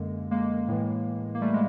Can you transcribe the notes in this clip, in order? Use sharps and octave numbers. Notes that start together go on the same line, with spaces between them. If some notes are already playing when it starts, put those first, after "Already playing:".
Already playing: F#2 D3 G#3 A#3
G#3 A#3
A2 E3
A#3
G3 A3
G#3